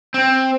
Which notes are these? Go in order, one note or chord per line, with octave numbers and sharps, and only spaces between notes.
C4